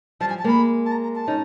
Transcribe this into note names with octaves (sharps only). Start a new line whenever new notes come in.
F3 G3 A5
G#5
A5
G#3 A#3 B5
A5
A#5
A#5
A5
C#4 D#4